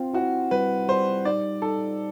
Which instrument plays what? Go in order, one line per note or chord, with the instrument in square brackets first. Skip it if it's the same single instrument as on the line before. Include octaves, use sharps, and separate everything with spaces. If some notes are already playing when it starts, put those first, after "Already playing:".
Already playing: [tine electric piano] C4 [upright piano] F4
[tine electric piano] E4 [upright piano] F#4
[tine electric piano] G3 [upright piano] B4
[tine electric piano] G3 [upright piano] C5
[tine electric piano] D#4 [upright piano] D5
[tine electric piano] D#4 [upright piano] A4